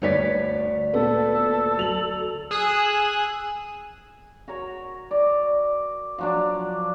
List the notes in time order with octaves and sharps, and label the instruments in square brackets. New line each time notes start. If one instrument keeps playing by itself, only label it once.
[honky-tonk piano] G1 B4 B6 [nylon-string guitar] D2 C#5 D5
[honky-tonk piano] A#2 B3 [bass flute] A4
[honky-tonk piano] F#3 F7 F#7
[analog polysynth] G#4 D#6 E6 F#6
[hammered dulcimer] F#4 A#4 C#5
D5
F3 F#3 D4